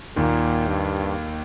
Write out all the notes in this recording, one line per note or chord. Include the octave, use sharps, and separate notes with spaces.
D#2 A#2 D#3
G2